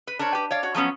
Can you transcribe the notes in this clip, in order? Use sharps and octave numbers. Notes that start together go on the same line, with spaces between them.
B4
D4 A#4 C5 C#5
G4 B4
C#5 D5 F5
F#4 C#5
F3 F#3 B3 C#4